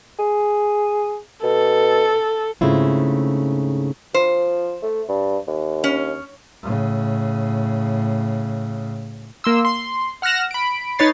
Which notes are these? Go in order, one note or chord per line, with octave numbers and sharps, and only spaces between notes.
G#4
B2 A4
G#2 C#3 A3 C4 E4 F4
F3 C5
A3
G2
D#2
C#4
A2 C#3
A#3 C6 E6
C6
F#5 F6 F#6 A#6 E7
B5 D7
D#4 B4 C#5 A6 C7